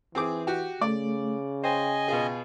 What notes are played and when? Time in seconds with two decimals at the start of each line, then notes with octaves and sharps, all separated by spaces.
0.15 E3 C4 G#4 D6
0.47 F#4 G4
0.81 C#3 A3 D5
1.64 C5 D#5 G5 G#5
2.08 B2 F4 G#4